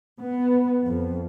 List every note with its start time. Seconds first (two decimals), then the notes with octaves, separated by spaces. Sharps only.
0.19 B3
0.82 F2